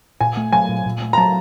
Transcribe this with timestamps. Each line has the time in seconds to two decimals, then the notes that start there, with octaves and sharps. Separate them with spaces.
0.21 A#2 G#5
0.37 A3
0.52 F#3 G#5
0.69 A#2
0.86 A#2
1.02 A3
1.13 A#5
1.18 F#3 A5